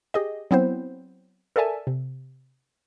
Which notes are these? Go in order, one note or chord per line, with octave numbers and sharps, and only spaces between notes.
G4 G#4 D#5
F#3 B3 C4 E4 C5
A4 A#4 D5 E5 G#5 A5
C3